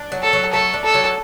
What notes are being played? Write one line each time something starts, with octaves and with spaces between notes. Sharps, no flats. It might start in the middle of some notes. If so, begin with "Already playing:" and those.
Already playing: D4
F#3
A4
F#3
A3 A4
D4
A4
F#3